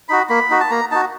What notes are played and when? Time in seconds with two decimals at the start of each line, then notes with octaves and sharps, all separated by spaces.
0.09 D#4 F#4 B5
0.29 A#3 B5
0.50 D#4 F#4
0.60 A5
0.71 A#3 A#5
0.91 D#4 F#4 A5